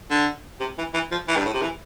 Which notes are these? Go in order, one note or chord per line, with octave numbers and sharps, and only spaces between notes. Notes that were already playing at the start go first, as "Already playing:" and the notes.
D3
C3
E3
E3
F3
E3
G2
A2
C3
E3